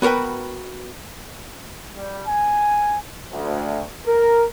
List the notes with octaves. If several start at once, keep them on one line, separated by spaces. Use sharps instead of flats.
B3 F#4 A#4 B4 G5
G3
G#5
D2
A#4